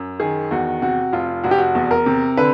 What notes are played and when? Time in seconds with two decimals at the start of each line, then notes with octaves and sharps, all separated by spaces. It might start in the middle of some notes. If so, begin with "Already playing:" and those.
Already playing: F#2
0.20 D#3 G#4
0.51 E2 F#4
0.82 C3 F#4
1.13 F1 F4
1.44 F1 F#4
1.51 G4
1.58 F#4
1.75 E2
1.91 A#4
2.06 C3
2.37 D3 B4